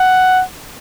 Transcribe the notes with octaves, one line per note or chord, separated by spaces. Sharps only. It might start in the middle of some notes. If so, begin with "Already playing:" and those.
Already playing: F#5